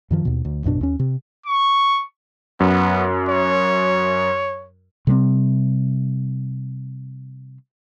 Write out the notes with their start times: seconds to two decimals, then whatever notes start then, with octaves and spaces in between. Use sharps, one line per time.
0.11 F#2 D#3 F3
0.25 D#2 B2
0.45 D2
0.64 A1 F#2 B2 D4
0.81 D#2 C#4
0.99 C3
1.46 C#6
2.60 F#2 B3
3.28 C#5
5.07 C3 G3 B3 C4